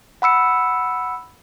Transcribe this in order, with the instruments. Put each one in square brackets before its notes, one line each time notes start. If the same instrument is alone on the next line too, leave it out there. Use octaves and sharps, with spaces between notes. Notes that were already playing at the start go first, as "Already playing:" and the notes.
[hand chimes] F#5 B5 E6 C#7